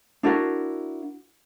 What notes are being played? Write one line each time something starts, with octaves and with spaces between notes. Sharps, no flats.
D4 E4 F#4 A#4